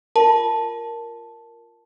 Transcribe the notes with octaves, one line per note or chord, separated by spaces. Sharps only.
F4 A#4 A5